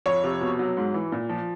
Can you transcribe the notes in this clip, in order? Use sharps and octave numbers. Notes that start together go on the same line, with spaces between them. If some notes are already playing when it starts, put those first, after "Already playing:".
F2 C#5
C3
B2
F#3
G#2
E3
A#2
F3